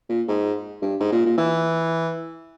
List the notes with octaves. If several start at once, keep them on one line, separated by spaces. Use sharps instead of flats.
A#2
G#2
G2
G#2
A#2
A#2
E3